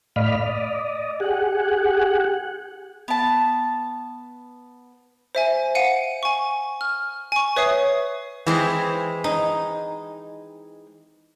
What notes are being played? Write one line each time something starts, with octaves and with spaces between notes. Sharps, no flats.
A2 D5 D#5 F5 B5 F6
D5 D#5
G4 G#4 F#5
B3 A5
C5 E5 G#5
F5 F#5 C#7 D#7
G#5 C#6
F6
G#5 C#6
B4 C#5 E5 D#6 C7
E3 G#3 C4
D#4